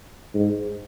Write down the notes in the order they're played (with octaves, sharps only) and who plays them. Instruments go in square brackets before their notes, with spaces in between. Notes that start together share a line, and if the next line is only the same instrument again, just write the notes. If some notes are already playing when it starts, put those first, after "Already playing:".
[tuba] G#2